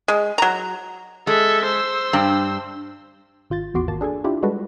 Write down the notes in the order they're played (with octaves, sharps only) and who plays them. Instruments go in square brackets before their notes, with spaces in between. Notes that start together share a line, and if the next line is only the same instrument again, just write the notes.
[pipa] G#3
F#3 A#5
[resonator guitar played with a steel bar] G#3 [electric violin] A4 E5
[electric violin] C5 E6
[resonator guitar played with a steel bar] G2
[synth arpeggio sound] G#1 F4 G6 A6
A1 E2 F#4 C6 D6
G#1 A#3 A5
D4 G#4 A4 G#5
D4 E4 F4 G4
G3 G#3 F#4 A4 B4